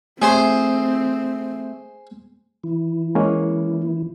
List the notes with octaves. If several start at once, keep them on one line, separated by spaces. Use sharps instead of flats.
A3 C4 G#4 C5
E3 E4
G#3 A#3 C#4